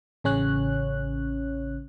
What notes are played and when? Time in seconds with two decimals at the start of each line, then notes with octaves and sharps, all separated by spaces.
0.24 A1 C#3 C#4 C#5 F#6